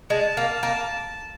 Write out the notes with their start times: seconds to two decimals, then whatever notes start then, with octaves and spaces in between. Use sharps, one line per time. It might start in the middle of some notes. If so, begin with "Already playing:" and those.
0.10 G#3 A5
0.37 A#3
0.63 A#3